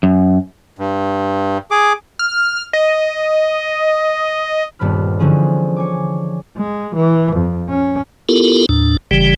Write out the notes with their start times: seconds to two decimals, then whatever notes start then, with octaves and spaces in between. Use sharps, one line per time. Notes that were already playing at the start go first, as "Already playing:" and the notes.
0.03 F#2
0.79 G2
1.71 G#4 D6
2.19 F6
2.73 D#5
4.79 D#1 G2 B3 C4 B5 F6
5.19 D3 E3 F3 C#4 G#4 C5
5.76 C#5 G#5 D6
6.58 G#3
6.96 E3
7.36 F2
7.69 C#4
8.29 B3 E4 F4 G4 A4 A#4
8.69 D#2 A2 D4
9.11 G1 C#3 E3 G3 G4